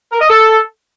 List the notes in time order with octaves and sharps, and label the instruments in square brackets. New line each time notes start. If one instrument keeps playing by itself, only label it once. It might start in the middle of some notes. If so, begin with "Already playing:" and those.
[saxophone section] A#4
D#5
A4